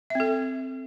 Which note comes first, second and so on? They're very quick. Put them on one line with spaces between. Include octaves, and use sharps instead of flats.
E5 C4 A4